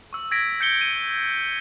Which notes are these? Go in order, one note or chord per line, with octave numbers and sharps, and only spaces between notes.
C#6 E6
E6 G#6 A#6 B6 D7
G6 C#7 G7
D#7